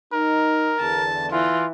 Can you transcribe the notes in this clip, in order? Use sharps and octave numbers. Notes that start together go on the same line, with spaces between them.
D#4 A#4
E2 D3 A5
E3 F4